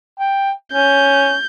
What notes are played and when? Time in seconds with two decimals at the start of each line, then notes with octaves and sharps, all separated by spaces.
0.19 G5
0.73 C#4 G6